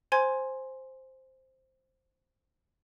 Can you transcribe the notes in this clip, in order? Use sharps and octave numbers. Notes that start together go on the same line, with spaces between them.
C5 G#5 C6 G#6